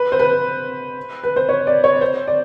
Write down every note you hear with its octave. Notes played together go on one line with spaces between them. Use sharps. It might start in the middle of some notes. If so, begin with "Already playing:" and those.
Already playing: B4
C5
B4
B4
C5
C#5
D5
C#5
C5
D5